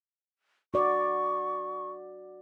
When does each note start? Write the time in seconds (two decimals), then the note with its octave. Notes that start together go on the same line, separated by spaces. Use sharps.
0.74 F#4 D5 C#6